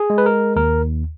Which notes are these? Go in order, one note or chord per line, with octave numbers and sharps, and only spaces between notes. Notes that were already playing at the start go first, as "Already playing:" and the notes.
Already playing: G#4
G#3
B4
A#4
D#2 A#4